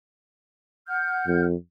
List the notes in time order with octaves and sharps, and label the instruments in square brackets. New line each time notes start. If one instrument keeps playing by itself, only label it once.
[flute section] F#5 F6 G6
[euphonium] F2